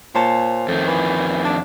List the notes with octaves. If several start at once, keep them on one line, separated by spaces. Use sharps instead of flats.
A#2 C5 C#5 A5
F2 D#3 A3
E3
D4